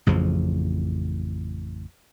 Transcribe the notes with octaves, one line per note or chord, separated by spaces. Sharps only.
A1 F2 C#3 F3